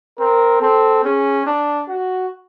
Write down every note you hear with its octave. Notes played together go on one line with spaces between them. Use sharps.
C4 A#4
C4 A4
C#4 G#4
D4
F#4